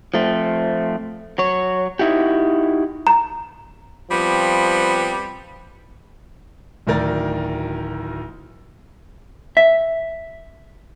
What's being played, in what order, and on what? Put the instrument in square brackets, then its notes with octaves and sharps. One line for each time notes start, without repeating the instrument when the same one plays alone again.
[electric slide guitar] F3 A3 C4
F#3 C#5
D#4 E4 F#4 G4
[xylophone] A#5
[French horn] F3 [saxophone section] G3 B3 C4
[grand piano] D1 D2 D#3 A#4 D5 A6
[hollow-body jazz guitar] E5